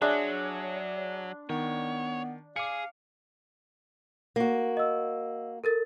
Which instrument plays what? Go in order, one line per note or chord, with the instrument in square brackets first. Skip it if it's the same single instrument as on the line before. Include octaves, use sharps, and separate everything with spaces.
[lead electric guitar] F#3 [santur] D4 C6 [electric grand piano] G#4 E5 G#5 [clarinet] C#5
[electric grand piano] D#3 [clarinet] B3 [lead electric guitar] C#5
[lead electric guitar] G#4 [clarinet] F5 [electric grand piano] D6 C#7
[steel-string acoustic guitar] A#3 F#4
[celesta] D#5 E6
A4 A#4 A6